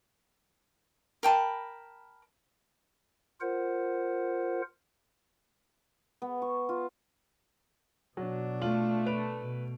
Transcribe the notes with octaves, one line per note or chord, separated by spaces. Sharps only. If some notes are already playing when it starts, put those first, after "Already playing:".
A#4 G5 A5 B5
F4 A#4 C5 F#5
B3
C#6
F4
B2 F#3 D4
A3 F4 F#7
B4 D7 F7
B2